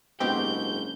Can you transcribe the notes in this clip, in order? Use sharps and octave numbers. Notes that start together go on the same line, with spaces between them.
F#1 G#2 B3 C4 D4 F#4 G4 G6